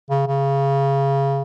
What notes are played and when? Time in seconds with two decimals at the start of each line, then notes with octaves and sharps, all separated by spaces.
0.10 C#3
0.27 C#3